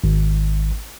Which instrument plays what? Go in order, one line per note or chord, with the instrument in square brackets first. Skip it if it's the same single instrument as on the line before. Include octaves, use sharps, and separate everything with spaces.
[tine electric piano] G#1